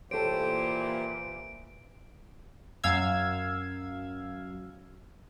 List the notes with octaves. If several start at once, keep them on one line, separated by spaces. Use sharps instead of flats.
A#2 E3 G4 A4 C5 C#5 D7
F#2 F5 E6 G#6